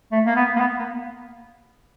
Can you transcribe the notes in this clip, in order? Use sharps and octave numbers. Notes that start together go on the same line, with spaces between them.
A3
A#3
B3
A#3
B3
A#3